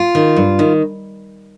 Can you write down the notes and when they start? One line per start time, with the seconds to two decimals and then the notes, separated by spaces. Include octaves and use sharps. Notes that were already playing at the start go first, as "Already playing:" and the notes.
Already playing: F4
0.15 D#3
0.36 G2
0.59 D#3